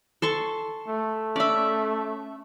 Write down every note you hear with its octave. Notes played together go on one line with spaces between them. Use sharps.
A4 C6 C#6
A3
C#4 D5 E5 B5